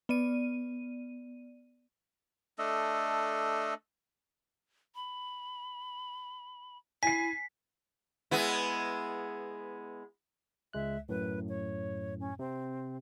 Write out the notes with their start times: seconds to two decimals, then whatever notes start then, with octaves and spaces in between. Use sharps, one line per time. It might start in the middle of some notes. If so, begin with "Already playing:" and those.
0.09 B3 D5 D#7
2.58 A3 D4 A4 D#5
4.95 B5
7.03 E4 G#5 B6 C7
8.31 G#3 B3 E4
10.73 C#2 G#3 E5 F#6
11.09 F#2 A2 B4
11.49 C#5
12.20 C#4
12.39 C3 C4